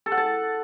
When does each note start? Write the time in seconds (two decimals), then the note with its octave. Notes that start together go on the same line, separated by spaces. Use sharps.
0.06 A4
0.12 F#5
0.17 A5